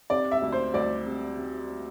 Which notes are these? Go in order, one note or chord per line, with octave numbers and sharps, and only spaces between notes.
C3 D5
E5
D2
C5
D2 D5
C3
C3